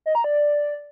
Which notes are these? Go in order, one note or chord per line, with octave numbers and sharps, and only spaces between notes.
D#5
A#5
D5